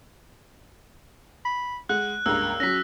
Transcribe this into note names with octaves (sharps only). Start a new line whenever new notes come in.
B5
G#3 F#5 F#6
C#2 G2 A#3 A#5 E6
F#3 C#4 A#6 B6